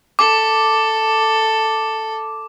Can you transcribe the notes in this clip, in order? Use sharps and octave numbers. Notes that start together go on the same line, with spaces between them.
A4 D6